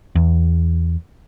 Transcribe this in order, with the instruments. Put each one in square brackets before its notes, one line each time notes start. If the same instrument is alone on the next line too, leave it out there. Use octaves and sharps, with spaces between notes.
[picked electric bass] E2